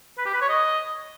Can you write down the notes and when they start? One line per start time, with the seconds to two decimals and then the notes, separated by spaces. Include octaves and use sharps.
0.18 B4
0.26 G4
0.33 B4
0.41 C#5
0.49 D#5